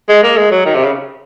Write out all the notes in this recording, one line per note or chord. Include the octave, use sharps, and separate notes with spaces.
G#3
A#3
G#3
F#3
D#3
C3
C#3